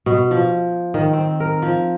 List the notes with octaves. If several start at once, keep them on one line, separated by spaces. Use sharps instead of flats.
B2
F3
D#3
C4
A#4
F3